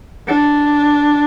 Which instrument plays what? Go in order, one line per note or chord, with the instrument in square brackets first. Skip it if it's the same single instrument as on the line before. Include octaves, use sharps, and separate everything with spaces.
[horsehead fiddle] D4